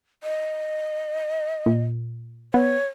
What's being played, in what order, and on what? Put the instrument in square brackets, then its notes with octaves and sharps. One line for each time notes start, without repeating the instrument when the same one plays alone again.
[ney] D#5
[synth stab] A#2
[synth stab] B3 [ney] C#5